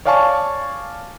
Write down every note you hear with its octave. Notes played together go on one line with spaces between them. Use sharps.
C#5 D5 F5 G#5 A5 C#6